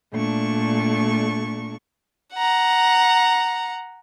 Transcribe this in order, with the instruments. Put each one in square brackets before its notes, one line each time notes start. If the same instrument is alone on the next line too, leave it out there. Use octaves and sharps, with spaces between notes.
[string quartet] A#2 A3 D4 C#6
[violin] F#5 A#5